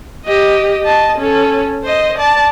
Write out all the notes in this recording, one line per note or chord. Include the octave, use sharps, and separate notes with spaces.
G4 D#5
D#5 A5
C#4 A4
C5 D#5
D5 A5